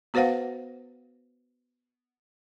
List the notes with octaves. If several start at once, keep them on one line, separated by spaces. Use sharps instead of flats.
B3 F#4 B4 C5 F5 F#5